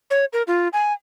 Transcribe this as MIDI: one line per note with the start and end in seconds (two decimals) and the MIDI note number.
0.11 0.25 73
0.33 0.42 70
0.47 0.68 65
0.73 0.93 80